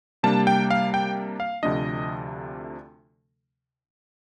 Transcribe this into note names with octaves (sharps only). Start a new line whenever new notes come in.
C3 G3 A#3 D4 A5
G5
F5
G5
F5
D2 C3 F3 A3 D4 D#5